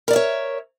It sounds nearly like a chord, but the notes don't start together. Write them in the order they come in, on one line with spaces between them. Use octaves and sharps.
A#4 D5 E5 C#5